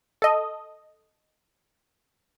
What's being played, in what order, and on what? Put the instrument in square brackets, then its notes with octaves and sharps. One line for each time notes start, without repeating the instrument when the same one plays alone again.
[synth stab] A4 D#5